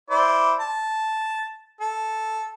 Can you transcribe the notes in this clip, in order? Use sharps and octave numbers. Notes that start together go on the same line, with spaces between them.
E4 C5 D5
A5
A4